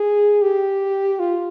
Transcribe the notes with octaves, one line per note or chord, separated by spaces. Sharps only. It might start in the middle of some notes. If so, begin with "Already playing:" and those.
Already playing: G#4
G4
F4